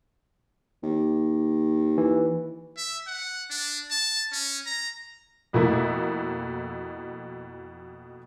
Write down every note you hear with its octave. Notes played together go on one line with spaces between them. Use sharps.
D#2
E3
E5
F#5
D4
A5
C#4
A#5
F2 B2 A3 A#3 E4